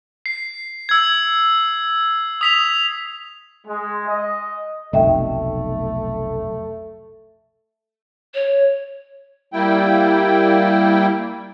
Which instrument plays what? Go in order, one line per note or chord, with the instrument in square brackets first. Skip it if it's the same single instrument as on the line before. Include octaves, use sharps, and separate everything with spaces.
[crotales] C7
E6 G#6
D#6 B6 F7
[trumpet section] G#3
D#5
[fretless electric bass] F1 B1 [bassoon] A3 [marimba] D#5 E5 G5
[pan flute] C#5
[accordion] G3 A#3 E4 G5